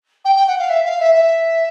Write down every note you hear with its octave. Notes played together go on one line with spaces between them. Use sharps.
G5
G5
F#5
F5
E5
F5
E5
E5